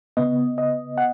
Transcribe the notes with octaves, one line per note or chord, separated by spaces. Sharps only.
C#3 B3 D#5
D#5
F#5